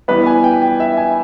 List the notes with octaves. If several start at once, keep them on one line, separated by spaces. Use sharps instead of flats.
E3 G3 B3 B4
G#5
G5
G5
E5
G#5